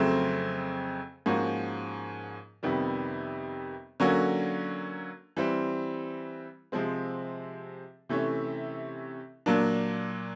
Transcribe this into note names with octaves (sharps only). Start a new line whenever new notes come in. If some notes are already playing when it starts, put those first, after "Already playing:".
Already playing: F2 C#3 F#3 A3 C4
G#2 F3 A#3 C#4 F#4
F2 C3 D#3 G3 B3
D3 F#3 A#3 C#4 F#4
E3 G3 C4
C3 F3 G#3 C4
C3 E3 A3 C#4
A#2 F#3 A#3 D4